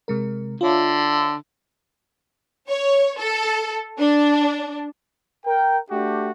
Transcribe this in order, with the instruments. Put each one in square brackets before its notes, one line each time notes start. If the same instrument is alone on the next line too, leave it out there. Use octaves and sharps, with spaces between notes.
[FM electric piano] C3 G#3 A#4
[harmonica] D3 [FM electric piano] F4 C#5 E5
[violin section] C#5
A4
D4
[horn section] A#4 G5
A3 D4 F#4 G4